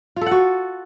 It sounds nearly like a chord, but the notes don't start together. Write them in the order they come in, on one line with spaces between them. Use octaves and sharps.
F4 A4 F#5 F#4